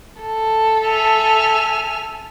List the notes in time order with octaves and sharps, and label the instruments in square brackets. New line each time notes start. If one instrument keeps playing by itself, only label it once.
[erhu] A4
[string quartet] E5 G#5 F6